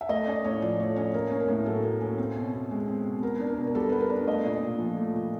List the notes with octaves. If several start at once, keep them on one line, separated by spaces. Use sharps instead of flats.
E5
A3 D#5
C#4 D5
A2 C#5
F3 D5
A3 C#5
C#4 C#5
A#3 A#4
C#4
A#4
A2
F#3 A4
A#3
C#4
C4
B2
B2
G#3
C4
B2
B3 A#4
D4
A#4
B2
A#4
G3 A4
B3 B4
A#4
D4
A3 D#5
A#2
A#2
F3
A3
A#2